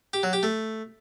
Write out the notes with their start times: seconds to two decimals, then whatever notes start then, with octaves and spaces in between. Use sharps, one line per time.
0.13 G4
0.23 F#3
0.33 G4
0.43 A3